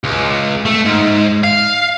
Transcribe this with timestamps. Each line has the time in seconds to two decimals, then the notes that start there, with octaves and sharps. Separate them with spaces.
0.04 C#2
0.66 A3
0.85 G#2
1.44 F5